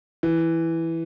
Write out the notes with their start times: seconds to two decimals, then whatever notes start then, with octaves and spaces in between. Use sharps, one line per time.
0.23 E3